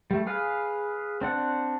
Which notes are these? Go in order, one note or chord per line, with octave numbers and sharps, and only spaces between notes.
G3 A3
G#4 B4 F5
C4 D4 F#5